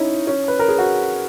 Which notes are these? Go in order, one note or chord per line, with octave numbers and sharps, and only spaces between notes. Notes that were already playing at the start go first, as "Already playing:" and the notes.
Already playing: C#4 D#4 E4
C#4
B4
A#4
G#4
F#4